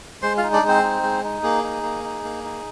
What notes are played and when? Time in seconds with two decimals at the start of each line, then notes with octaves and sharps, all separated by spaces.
0.22 G#3 C5 C6
0.37 F4 F5
0.43 D#4
0.53 D4 D5
0.63 G#3
0.68 C4 C5
0.84 D#4
1.03 G#3
1.24 D#4
1.43 A#3 G#4
1.63 D#4
1.83 A#3
2.04 D#4
2.24 A#3
2.44 D#4